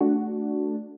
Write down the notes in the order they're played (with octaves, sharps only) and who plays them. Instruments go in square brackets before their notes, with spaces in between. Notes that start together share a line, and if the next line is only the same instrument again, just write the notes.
[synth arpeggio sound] A3 D4 F#4